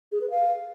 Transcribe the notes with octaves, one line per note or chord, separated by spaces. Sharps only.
G#4
B4
F5